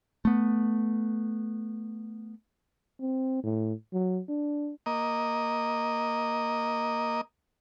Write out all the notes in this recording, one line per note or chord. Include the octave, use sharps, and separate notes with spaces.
A3 B3
C4
A2
F#3
D4
A#3 D#5